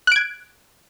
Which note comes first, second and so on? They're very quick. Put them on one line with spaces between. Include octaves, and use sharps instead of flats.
F#6 D7 G#6